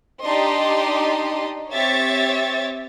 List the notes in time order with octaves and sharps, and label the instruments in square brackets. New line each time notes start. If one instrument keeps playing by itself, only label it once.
[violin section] D4 D#4 G4 D5 D#5 C6
C4 G4 C#5 E5 A6